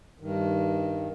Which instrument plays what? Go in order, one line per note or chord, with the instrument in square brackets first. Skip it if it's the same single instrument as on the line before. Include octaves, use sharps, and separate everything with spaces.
[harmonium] G2 D#3